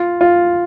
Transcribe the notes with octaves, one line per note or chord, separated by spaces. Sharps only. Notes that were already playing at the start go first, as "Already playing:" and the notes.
Already playing: F4
F4